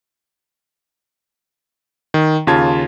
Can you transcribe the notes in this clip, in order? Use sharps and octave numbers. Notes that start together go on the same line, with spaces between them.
D#3
D#2 C#3 F4 A5 G#6